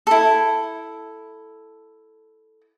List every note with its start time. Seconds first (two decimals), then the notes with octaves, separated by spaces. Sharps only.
0.07 E4 A4